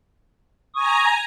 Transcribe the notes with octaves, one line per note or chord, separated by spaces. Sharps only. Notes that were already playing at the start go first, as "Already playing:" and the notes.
G#5 A#5 C#6 D#6